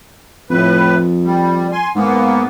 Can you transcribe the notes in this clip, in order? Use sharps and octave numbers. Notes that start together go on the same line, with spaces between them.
F2 A2 B4
G3
G#5 C6
G#2 A#3 B3